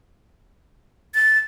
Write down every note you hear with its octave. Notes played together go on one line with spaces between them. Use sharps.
A6